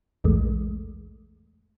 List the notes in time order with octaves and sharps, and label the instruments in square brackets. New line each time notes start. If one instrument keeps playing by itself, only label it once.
[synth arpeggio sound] A#1 E2 G#2 G#3 A3